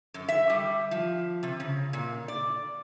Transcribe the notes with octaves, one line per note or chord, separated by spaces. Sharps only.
F#2
E5
G3
F3
C3
C#3
A#2
D5